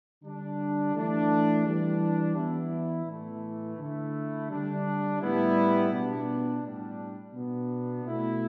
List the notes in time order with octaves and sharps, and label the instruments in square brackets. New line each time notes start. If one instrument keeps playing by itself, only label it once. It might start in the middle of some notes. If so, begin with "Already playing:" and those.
[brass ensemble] D3 G3 D4
E3 A3 D4
E3 G3 D4
E3 B3 E4
A2 E3 A3
D3 A3 E4
D3 G3 D4
A2 G3 B3 E4
B2 B3 D4
A2 G3 D4
B2 B3 D4
B2 A3 E4